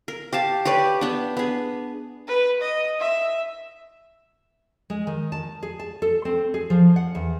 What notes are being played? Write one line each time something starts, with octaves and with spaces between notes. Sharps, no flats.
A#4
G4 F5 A5
G4 B4 C#5 D5
B3 D4
B3 G#4
B4
D#5
E5
G#3
D#3
A5
G#4
A5
A4
C4
G#4
F3
F#5
E2